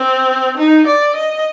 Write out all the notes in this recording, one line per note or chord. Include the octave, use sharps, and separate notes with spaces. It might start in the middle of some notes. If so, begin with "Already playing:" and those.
Already playing: C4
D#4
D5
D#5